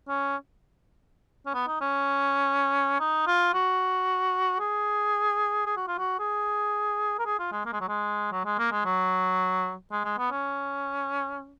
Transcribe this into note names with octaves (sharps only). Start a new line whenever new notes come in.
C#4
C#4
B3
D#4
C#4
D#4
F4
F#4
G#4
G#4
F#4
F4
F#4
G#4
A#4
G#4
F4
G#3
A#3
G#3
F#3
G#3
F#3
G#3
A#3
G#3
F#3
G#3
G#3
B3
C#4